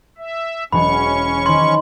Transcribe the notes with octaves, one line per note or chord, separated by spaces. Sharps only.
E5
E1 F#3 C#4 G#4 B5 C#6
D#3 C5 C6 G#6